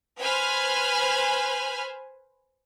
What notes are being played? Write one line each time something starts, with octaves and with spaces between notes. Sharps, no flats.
B4 C5 G#5 B5 F6